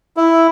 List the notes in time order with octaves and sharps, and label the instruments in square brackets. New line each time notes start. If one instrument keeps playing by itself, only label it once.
[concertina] E4